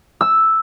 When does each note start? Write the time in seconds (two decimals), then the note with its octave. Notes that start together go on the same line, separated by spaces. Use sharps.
0.21 E6